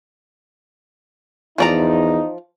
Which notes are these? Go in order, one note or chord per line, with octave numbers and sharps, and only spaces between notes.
E2 F3 D#4 D5 A#5